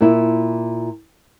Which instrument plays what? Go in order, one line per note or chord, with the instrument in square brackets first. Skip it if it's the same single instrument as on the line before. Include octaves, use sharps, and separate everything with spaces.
[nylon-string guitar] A#2 E4